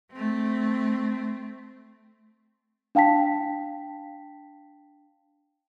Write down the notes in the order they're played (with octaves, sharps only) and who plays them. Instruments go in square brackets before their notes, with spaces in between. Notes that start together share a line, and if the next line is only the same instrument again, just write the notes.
[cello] A3 C4
[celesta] D4 F5 G5 A5 B6